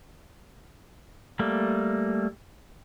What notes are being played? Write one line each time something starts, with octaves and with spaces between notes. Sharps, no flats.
G3 A3 A#3